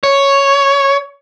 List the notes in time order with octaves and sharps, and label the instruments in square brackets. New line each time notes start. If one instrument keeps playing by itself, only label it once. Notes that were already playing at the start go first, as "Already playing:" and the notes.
[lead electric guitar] C#5